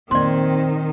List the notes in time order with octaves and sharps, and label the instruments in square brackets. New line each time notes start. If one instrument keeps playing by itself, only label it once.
[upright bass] F2 A#2 [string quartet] D#3 [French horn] C4 [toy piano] D5 C6